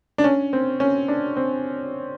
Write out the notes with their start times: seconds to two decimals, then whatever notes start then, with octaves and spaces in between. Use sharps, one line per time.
0.18 D4
0.24 C#4
0.53 C4
0.80 C#4
1.08 D4
1.36 C4